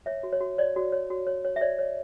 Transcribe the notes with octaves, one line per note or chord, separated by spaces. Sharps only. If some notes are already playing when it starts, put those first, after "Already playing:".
C#5 E5
F#4
C#5
F#4
C#5 D5
F#4
C#5
F#4
C#5
C#5
E5
C#5 D5
C#5